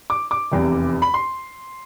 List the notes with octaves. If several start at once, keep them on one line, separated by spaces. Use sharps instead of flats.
D6
D6
F1 E2 C3
B5
C6